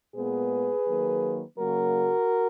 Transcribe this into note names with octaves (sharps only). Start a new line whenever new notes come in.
A#2 G#3 B3 G#4 B4
D#3 F#3 A#3
C#3 F#3 A#3 F#4 A#4